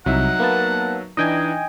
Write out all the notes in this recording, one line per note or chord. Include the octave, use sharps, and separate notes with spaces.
C2 F#3 D#4 E5 F#5
A#3 B3 A5
E3 D4 D#4 D#5 G5 G#5